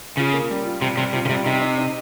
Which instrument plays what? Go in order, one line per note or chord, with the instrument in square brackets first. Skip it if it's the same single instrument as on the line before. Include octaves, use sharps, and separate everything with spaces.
[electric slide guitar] C#3 [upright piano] F4
[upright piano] A#3
G3
F4
[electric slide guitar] C3 [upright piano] G3
[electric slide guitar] C3 [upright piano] G3
[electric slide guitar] C3 [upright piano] F4
[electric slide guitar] C#3
[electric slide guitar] C3 [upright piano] G3
[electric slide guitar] C3 [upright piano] D#4
[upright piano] D#4
D#4